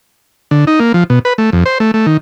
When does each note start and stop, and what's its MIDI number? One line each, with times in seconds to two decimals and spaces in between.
0.51 0.65 50
0.67 0.79 63
0.80 0.92 58
0.94 1.04 53
1.10 1.19 47
1.25 1.33 71
1.38 1.50 57
1.53 1.64 41
1.66 1.78 72
1.80 1.91 57
1.94 2.06 57
2.06 2.17 51